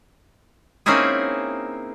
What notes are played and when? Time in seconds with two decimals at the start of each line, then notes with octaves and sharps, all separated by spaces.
0.86 A#3 C4 C#4 D#4 E4 G#4